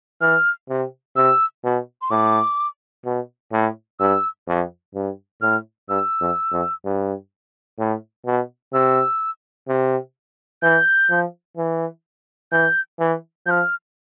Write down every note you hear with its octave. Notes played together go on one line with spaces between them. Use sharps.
E3 F6
C3
C3 E6
B2
C6
A2 D6
B2
A2
G2 E6
F2
G2
A2 F6
G2 E6
F2
F2
G2
A2
B2
C3 E6
C3
E3 G6
F3
E3
E3 G6
E3
F3 F6 G6